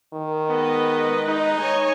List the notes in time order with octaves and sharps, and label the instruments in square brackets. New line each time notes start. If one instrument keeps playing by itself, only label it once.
[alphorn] D#3
[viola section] G#3 B4 D#5 [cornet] B3
[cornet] D#4
[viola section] C#5 D#5 G#5